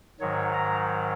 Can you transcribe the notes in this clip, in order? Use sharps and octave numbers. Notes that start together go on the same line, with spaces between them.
G#2 D#3 F#3 C#5
A#5